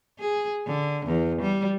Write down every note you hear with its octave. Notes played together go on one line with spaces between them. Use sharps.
G#4
D3
E2
G3